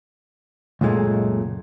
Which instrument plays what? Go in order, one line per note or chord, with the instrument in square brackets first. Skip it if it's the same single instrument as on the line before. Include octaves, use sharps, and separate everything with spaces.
[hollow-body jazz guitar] C#2 F#2 A#2 G#3 A3